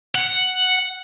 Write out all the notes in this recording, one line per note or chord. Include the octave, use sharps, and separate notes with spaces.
F#5